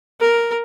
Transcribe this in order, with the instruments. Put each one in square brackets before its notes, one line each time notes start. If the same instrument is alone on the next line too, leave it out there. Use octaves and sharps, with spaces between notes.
[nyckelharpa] A#4